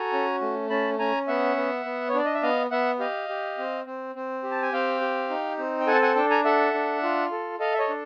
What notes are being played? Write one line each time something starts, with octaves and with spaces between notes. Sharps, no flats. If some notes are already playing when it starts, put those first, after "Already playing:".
Already playing: F#4 A4 G#5 A#5
C#4
A3
C#4 A5 B5
C#4 G#5 A#5
B3 E5 F#5
B3
B3
C#5
D4 D5
D#5
E5
B3 D#5 F5
B3 E5 F#5
G4 D#5 F5
G4
C4
C4
C4
G4
A5
G#5
C4 F5 G5
G4
D#4
C4
G5
A4 F#5 G#5
A5
F#5 G#5
D4 G5 A5
G#5 A#5
A4 E5 F#5
D4
F4
A4
A4 D#5 F5
E5
C#5 D#5
D4